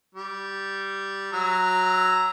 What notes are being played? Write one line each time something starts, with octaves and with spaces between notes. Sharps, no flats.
G3
F#3 A#5 E6